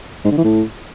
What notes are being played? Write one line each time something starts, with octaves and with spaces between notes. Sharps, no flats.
G#2
D3
E3
A2